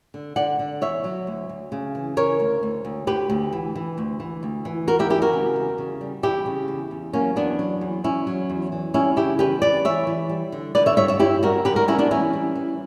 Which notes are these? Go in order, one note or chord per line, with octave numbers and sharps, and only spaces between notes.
D3
D3 D5 F#5
D3
E2 C#5 E5
F#3
D2
D2
C#3
E3
C#3 A#4 C#5
D2
D2
D2
D2 G4 B4
D2
E3
E3
D2
E3
D2
E3
E2 F#4 A#4
E4 G4
E3 E4 G4
F#4 A#4
C#3
E2
C#3
G3
E2 E4 G4
C#3
E2
E2
F#3 A#3 C#4
E2 B3 D4
F#3
E2
E2 C#4 E4
F#3
E2
E3
G3 C#4 E4
C#3 E4 G4
E2 G4 B4
E2 B4 D5
E3 C#5 E5
E3
G3
D3
D3 B4 D5
C#5 E5
G2 C#5 E5
C#5 E5
G2 E4 G4
G3 F#4 A#4
D3 G4 B4
F#4 A#4
G3 C#4 E4
B3 D4
E3 C#4 E4
G3
E3